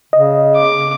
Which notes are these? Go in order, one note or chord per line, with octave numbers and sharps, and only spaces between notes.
C#3 D#5
D6